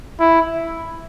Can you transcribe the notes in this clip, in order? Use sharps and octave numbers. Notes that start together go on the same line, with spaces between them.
E4